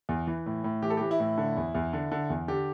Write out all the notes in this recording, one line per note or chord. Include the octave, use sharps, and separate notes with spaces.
E2
E3
A2
A2
E3 G4
A4
E3 G4
E4
A2
D3
E2
E2
D3
D3
E2
D3 G4